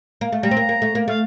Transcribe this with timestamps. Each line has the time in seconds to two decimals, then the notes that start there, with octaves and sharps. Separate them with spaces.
0.21 A#3
0.32 A3
0.43 G3 A#5
0.51 C4
0.57 A#3
0.69 A#3
0.82 A3
0.95 A#3
1.08 A3 F5